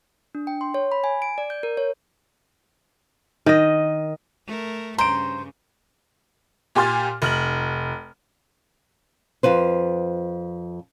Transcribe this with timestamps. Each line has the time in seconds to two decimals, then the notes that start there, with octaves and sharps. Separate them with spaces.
0.35 D4
0.47 G5
0.61 C6
0.74 C#5
0.92 B5
1.04 G#5
1.22 D7
1.38 D5
1.50 G6
1.63 A#4
1.77 C#5
3.46 D#3 D#5
4.47 A3 A#4
4.98 G2 C#3 C5 A#5 D7
6.75 A#2 G4 G#5 C6 F6 A6
7.22 F1 F6 F#7
9.43 F2 F4 B4 C5